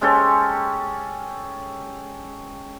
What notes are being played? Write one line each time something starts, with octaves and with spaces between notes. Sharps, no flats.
G#3 C#4 G4 A4